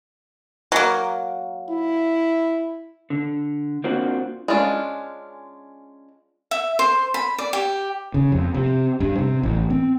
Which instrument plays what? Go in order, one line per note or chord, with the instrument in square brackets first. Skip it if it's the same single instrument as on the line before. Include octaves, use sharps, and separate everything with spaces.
[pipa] F#3 A#3
[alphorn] E4
[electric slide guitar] D3
A#3 C4 D4 F4 F#4
[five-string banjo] G#3 C#4 D4 F4
[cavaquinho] E5
C5
B5
D5
G4
[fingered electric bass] C#3
F2
C3
G2
C3
A1
C4